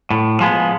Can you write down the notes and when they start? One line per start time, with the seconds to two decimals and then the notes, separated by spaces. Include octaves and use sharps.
0.11 A2
0.40 F3 G#3 B3